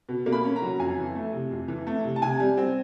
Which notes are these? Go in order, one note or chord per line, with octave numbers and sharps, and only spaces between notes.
B2
A#3
B5
C#4
A#5
F#3
F2 G#5
E3
A3
C3
F2
E3
A3
C3
A5
C3 G#5
G3
C4